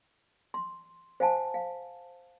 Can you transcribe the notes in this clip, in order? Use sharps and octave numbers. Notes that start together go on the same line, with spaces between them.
C6
C5 F5 F#5 G#5 A5
F5